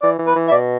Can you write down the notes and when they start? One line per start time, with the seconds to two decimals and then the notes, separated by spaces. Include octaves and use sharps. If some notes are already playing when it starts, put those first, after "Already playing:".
0.02 E3 D5
0.19 E3
0.27 B4
0.35 E3
0.48 E5
0.51 B2 D5